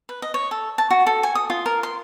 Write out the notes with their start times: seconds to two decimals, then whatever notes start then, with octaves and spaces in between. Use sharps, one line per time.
0.09 B4
0.22 D#5
0.34 C#5
0.51 A4
0.78 A5
0.91 F#4
1.07 A4
1.23 G#5
1.35 D#6
1.50 F4
1.66 A#4
1.83 C6